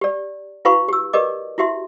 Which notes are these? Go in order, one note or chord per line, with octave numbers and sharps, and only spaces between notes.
G4 D5
E4 F#4 B4 F5 B5 C#6
G4 E6
G4 A#4 B4 D5 D#5 D6
E4 F#4 G4 E5 C6